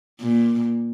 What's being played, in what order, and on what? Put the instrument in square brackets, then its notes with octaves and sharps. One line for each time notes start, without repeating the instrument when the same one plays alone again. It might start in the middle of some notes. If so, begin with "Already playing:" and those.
[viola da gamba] A#2